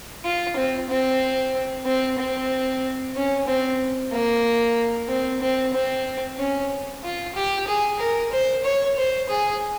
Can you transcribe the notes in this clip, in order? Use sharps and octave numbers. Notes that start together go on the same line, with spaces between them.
F4
C4
C4
C4
C4
C#4
C4
A#3
C4
C4
C4
C#4
F4
G4
G#4
A#4
C5
C#5
C5
G#4